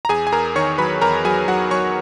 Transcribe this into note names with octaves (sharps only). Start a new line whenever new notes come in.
A#5
E2 G#4 G#5
G#5
E2 A#4 A#5
D#3 C#5 C#6
F#3 B4 B5
E2 A#4 A#5
F#3 G#4 G#5
F#3 F#4 F#5
F#3 C#5 C#6